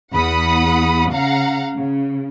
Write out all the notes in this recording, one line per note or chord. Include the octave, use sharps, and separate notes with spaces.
E2 F#5 B5 D#6
C#3 F5 F#5 A#5
C#3